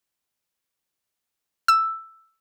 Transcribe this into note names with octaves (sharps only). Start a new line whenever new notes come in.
E6